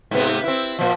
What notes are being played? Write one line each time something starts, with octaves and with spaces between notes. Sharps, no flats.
G#2 C3 B3
C4 E4
A#2 F3